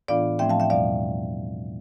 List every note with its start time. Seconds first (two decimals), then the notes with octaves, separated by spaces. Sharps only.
0.08 A2 E3 B3 D4 F4 D5 F5
0.39 A2 F3 A3 C4 E5 G5
0.49 F5 A5
0.60 E5 G5
0.70 E2 B2 G3 D5 F5